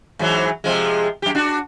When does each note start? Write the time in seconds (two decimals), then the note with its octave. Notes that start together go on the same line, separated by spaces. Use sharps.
0.19 G#2 E3 F#3
0.64 C3 F3 G#3
1.22 F#2 G4
1.35 D4 F#4